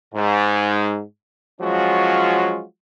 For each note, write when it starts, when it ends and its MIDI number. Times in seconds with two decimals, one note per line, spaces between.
0.14 1.03 44
1.61 2.63 53
1.61 2.63 54
1.61 2.63 56
1.61 2.63 61
1.61 2.63 65
1.61 2.63 66